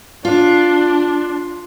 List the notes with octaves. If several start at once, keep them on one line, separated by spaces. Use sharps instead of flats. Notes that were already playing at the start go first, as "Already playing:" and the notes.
D4 F4